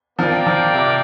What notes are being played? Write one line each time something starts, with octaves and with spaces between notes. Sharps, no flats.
F3 A#3 D4 A#4 D5 G5
F3
C3